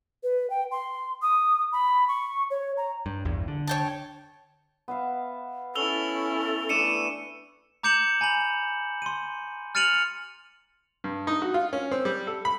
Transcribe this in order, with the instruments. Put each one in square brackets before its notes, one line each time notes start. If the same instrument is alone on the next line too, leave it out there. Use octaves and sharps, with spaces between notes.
[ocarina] B4
G5
C6
D#6
B5
C#6
C#5
A#5
[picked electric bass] G2
A#1 E2 G2
D3
[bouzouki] C#5 G5 A5
[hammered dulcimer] B3 E5 F5
[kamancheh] C#4 E4 [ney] A4 [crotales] E6 F7 G7
[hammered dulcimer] E3 A3 D4 [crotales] C#7 D#7 E7
[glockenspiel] A#5 D6 G6 C#7 E7 F#7
G#5 A#5 B5 F#7
C6 D#7
F6 A6 C#7 D#7 F7 F#7
[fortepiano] G2
D#4
F#4
F4
C#4
C4
G3
A4
B5